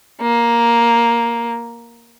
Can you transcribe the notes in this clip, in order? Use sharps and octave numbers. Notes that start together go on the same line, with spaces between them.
A#3